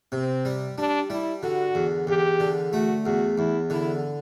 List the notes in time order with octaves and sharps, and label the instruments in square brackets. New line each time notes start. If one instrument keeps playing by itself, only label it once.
[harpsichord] C3 [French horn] C4
[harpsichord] G3
[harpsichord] G3 [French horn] D4
[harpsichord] G3 [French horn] E4
[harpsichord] D3 [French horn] F#4
[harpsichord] E2
[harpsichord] E2 [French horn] G4
[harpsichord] D3
[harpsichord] A3 [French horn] F#4
[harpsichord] E2 [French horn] F#4
[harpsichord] E2 [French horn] E4
[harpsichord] D3 [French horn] E4